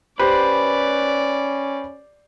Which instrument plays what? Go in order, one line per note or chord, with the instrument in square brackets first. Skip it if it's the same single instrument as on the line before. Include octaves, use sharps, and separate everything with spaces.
[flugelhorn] C#4 [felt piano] G4 C5 [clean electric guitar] B4 [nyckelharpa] D5